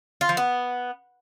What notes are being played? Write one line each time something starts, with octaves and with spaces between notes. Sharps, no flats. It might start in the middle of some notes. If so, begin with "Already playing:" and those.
F4
F3
B3